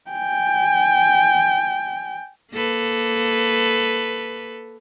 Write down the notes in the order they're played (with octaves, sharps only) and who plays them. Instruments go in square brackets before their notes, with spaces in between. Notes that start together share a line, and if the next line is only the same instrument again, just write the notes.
[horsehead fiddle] G5 G#5
[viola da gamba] A#3 A4 B4